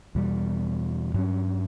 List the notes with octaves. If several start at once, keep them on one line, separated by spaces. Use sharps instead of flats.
E2 B2 G3
G2 F#3 C#4